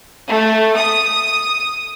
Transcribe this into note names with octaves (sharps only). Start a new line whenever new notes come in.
A3
D#6